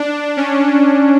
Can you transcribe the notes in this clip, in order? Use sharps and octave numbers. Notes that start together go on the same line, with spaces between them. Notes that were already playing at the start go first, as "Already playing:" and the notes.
Already playing: D4
C#4